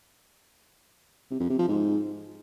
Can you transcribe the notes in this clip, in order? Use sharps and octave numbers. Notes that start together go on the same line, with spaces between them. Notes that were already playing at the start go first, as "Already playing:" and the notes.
C3
F2
C3
F3
G#2